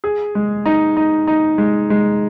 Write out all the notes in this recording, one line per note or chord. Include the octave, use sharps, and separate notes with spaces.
G#4
G#3
D#4
D#4
D#4
G#3
G#3